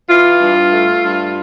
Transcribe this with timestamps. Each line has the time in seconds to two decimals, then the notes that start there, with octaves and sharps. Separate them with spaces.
0.09 E3 F4
0.41 G2
0.72 A3
1.04 G2